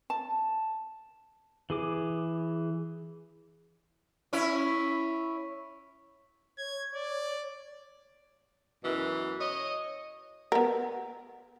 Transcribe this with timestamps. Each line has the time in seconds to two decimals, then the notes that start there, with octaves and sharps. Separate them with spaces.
0.10 A5
1.70 E3 G#4 D6
4.33 C#4 E4
6.58 C#5 G#6
6.95 D5
8.83 F#2 B2 E3
9.40 C#5 D#5
10.52 B3 A#4